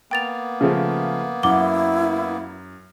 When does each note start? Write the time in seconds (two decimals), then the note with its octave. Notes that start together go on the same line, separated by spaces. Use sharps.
0.11 A#3 B3 G5 A6 F7
0.61 C#3 F3 A3
1.43 F#2 E4 F#5 D6 G7